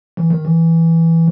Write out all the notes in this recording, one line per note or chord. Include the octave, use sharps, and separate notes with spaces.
E3
D#3
E3